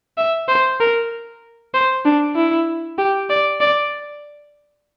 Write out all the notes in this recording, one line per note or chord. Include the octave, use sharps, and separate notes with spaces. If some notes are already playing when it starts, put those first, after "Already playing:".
E5
C5
A#4
C5
D4
E4
G4
D5
D5